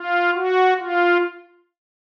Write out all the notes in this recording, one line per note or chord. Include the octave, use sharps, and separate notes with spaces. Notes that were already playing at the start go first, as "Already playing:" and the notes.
Already playing: F4
F#4
F4